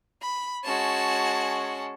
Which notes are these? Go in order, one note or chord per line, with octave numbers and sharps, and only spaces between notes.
B5
G#3 C#4 F#4 A5